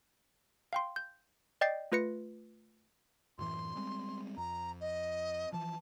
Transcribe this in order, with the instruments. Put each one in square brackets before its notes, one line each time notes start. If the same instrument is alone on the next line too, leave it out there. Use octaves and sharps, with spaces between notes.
[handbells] F5 G5 C6
G6
D5 D#5 G5 G6 A6 C7
A3 F4 B4 A#6 C#7
[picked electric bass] F#2 A2 E3 [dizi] C6
[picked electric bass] G3 G#3 C4
[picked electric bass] F2 [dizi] A#5
[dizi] D#5
[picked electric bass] E3 F3 [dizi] A5